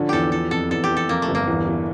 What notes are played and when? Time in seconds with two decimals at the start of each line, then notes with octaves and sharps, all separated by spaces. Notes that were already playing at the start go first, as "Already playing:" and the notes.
Already playing: D3 F3 C#4
0.09 E2 G4 A4
0.32 F3 A4
0.51 F2 A4
0.71 E2 A4
0.84 G4
0.90 E3
0.97 A4
1.09 F2 A#3
1.22 A3
1.28 G1
1.35 A#3
1.48 E2
1.67 E3